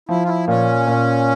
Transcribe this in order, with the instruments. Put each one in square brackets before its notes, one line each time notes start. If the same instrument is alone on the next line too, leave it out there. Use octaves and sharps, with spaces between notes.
[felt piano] F3 [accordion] E4
[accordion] F4
E4
[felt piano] A#2 [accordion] C#4
[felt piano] A#2